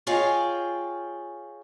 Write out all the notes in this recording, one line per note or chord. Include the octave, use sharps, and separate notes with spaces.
F4 G#4 C#5 D#5 F5 G5